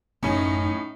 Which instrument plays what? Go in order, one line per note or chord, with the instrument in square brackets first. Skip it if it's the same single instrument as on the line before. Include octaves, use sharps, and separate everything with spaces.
[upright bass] A1 F#2 [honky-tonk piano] A2 C#4 [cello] D#4